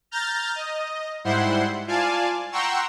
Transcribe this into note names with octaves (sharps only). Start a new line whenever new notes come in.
A#5 F6 G6 A6
D#5
G#2 G3 E4 C5 F#5 C6
F4 D5 F5 G#5 A5
F#5 G5 A#5 C6 C#6 E6